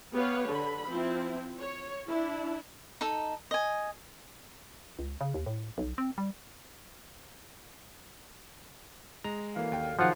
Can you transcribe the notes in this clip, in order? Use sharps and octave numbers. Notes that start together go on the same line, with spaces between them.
B3 G4 B4 C#5 F5
D3 B5
F3 C4 E4
C#5
D4 E4
D#4 A4
D#5 G#5
C#2
C#3
D#2
A2
B1
C4
G3
G#3 A#5
F#2 D3 E3 A#3 F5
D#2 G5
G#2 C3 D#3 F3 F#3 F4 C5 F#5